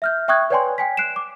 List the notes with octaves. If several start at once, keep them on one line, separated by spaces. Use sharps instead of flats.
E5 F6 G6
E5 G5 C#6 D#6 F#6 G#6
B4 C#5 D5 G5 G#5 C6
G5 G#5 B6
F#6 C7 D7 E7
D6